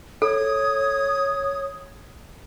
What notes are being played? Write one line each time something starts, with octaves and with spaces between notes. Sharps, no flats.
A4 C#5 D#6